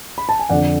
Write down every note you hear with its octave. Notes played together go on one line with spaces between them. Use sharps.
B5
A5
G#5
F2 D3 D5 F#5